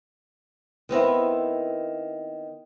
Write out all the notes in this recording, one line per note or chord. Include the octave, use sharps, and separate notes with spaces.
D#3 B3 C4 E4